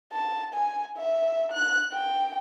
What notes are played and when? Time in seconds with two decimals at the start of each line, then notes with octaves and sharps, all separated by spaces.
0.13 A5
0.54 G#5
0.97 E5
1.52 F#6
1.93 G5